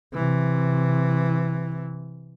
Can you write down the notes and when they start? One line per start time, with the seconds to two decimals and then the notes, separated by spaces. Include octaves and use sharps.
0.13 C3 E3